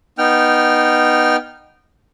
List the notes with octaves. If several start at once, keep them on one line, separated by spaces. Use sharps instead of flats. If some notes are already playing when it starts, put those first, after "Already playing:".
B3 D#4 G5 F6